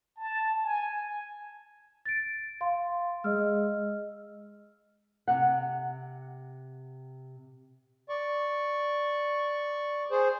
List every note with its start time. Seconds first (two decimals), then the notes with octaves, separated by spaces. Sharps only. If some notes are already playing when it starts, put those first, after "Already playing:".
0.17 A5
0.64 G#5
2.05 A6 D7
2.61 F5 C6
3.24 G#3 D#5 E6 F6
5.28 C3 F#5
8.09 D5 C#6
10.11 G#4 C5